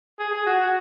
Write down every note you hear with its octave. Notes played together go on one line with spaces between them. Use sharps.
G#4
G#4
F#4
F#4